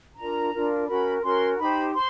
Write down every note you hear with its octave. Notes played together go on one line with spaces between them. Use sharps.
D4 F4 A#4 A#5
D4 F4 A#4
C#4 F#4 A#4 B5
C#4 F#4 A#4 C6
D#4 G4 C5 B5
C5 C6